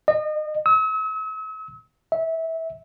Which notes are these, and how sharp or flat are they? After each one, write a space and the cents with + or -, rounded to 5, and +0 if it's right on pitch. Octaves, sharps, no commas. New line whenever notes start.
D#5 -35
E6 -45
E5 -20